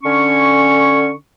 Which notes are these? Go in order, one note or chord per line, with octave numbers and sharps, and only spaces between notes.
D3 C#4 C#6